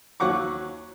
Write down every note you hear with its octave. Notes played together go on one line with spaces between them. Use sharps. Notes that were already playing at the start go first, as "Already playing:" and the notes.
D#2 F#3 F#5 C#6 D6